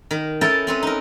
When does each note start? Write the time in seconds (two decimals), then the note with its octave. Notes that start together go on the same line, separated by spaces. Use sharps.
0.11 D#3
0.41 C#4 E4 A4 A#4 G5 A5
0.67 C4 C#4 B4
0.83 D#4 A#4